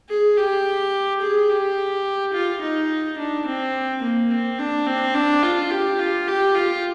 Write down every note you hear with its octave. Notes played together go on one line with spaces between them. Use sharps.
G#4
G4
G#4
G4
F4
D#4
D4
C4
A#3
C4
D4
C4
D4
F4
G4
F4
G4
F4